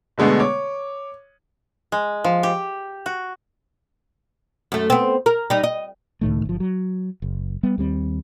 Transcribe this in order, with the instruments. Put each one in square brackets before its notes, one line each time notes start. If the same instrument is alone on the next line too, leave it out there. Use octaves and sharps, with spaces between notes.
[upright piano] B2 D3 G#3 A3 B3
C#5 D6
[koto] G#3
F3
G4
F#4
[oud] F#2 A3
B3 C4
A#4
G3 D#4
D#5
[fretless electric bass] C#2 A2 D#3 A3
G1 F3
F#3
F#1
G3 B3
D#2 G3 C4